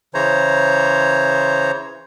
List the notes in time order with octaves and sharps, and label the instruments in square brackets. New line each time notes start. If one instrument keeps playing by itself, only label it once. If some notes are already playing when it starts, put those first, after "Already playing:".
[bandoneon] C#3 E3 C5 C#5 A#5